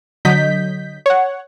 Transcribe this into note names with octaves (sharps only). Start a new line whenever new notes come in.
D3 F#3 D#5 G6 B6
C#5 F#5